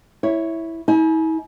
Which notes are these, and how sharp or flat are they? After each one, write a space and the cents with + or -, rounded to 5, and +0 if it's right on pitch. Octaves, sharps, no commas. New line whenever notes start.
E4 -5 C#5 +0
E4 -45 G#5 +40